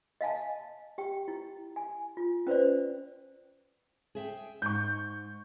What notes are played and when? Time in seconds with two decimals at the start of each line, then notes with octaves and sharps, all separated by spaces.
0.21 D#5 F5 G#5 A5
0.98 G4 G5
1.28 E4
1.76 G#5
2.17 F4
2.47 C#4 B4 C5 D5
4.15 G#4 E5 G5
4.62 G#2 C#6 G6